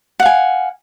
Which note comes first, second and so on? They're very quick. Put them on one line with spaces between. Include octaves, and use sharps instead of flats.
F#5 F5 G#5